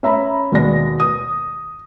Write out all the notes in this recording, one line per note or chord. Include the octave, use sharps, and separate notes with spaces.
C#4 E5 A#5 B5
D#2 B2 G#3 D5 A#6
D#6